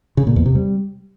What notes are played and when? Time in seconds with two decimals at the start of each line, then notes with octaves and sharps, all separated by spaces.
0.17 C#3
0.27 A#2
0.36 E2
0.46 C3
0.55 G3